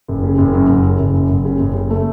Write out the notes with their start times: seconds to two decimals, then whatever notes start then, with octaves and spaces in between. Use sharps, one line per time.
0.08 F#1
0.24 C#3
0.38 F#1
0.53 F#2
0.68 F#1
0.84 C#3
0.99 F#1
1.14 F#2
1.29 F#1
1.45 C#3
1.60 F#1
1.75 C#3
1.90 A3